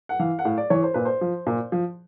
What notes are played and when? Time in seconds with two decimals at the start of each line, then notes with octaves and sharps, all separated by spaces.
0.09 F#5
0.19 E3 F5
0.39 F#5
0.45 A2 F5
0.58 D5
0.70 E3 C#5
0.83 C5
0.94 A#2 B4
1.05 C5
1.21 F3
1.47 A#2
1.72 F3